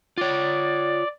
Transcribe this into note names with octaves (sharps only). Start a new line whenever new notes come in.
F4 C#5 D5